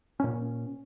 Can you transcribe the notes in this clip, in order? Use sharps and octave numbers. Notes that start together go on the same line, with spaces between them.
A#2 C#4